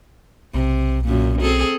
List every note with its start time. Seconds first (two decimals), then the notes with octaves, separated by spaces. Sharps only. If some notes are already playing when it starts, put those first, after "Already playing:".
0.54 B1 C3
1.05 F#2 A#2
1.41 C4 G#4 A4